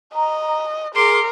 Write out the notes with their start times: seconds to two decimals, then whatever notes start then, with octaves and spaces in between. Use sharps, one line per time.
0.15 D#5 A#5
0.95 G#4 A#4 C6 D6